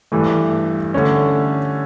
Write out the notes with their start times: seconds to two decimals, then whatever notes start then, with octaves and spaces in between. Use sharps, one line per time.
0.12 G2 E3 A3
0.94 D3 A3 C#4